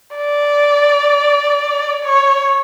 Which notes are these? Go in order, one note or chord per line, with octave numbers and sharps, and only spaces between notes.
D5
C#5